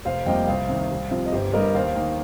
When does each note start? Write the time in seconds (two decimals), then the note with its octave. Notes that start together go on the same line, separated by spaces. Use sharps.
0.05 F1 C5 F5
0.26 F2 C3 G3 A#3 D#5 G5
0.47 C2 C5 F5
0.69 C3 D#3
0.91 C2
1.11 C3 F3
1.26 D#5
1.32 G1 G4 C5
1.53 G2 G3 A#4 D#5
1.74 D#2 C5 F5
1.96 D#3 A#3